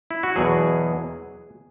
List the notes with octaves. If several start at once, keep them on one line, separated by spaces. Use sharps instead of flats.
E4
F#4
E2 B2 F#3 G#4